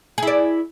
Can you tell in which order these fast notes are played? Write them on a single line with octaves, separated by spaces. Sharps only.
G#4 E4 D5